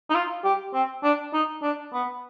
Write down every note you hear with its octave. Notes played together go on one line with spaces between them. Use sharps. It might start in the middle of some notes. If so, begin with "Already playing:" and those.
D#4
F4
G4
C4
D4
D#4
D4
B3